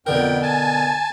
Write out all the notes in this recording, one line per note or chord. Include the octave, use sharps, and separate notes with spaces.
F2 B2 D3 A#4 G5
G#5 A5